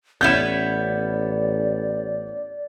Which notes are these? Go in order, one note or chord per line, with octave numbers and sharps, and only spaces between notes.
A1 B3 C#4 E4 D5 G6 E7